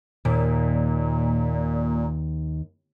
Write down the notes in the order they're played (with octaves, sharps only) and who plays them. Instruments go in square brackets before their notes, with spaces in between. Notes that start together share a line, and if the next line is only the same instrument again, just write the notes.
[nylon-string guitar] D#2 [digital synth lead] A#2